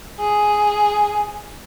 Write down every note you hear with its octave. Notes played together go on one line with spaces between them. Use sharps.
G#4